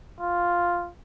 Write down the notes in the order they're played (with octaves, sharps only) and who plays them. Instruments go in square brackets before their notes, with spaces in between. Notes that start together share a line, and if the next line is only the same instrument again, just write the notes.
[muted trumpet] F4